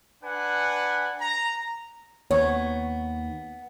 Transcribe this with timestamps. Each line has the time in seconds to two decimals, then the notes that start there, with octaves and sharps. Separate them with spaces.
0.23 D4 B4 F#5 G#5
1.20 A#5
2.31 D#2 B3 C#5